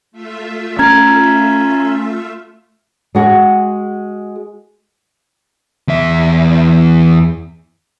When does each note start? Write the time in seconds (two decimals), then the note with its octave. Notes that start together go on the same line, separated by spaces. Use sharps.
0.12 A3 F4 E5
0.79 C#4 A#5 F6 G#6
3.15 G#3 F#4 G#4
5.88 E2 E5